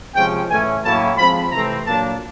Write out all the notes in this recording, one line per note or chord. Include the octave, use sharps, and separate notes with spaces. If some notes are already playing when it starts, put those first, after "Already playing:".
C3 F3 G#3 C#4 G5
A2 E3 A3 C#4 G#5
A2 F#3 A#3 C#4 E4 A5
F3 G#3 C4 B5
C3 E3 A3 C4 A#5
A#2 F#3 A#3 D4 A5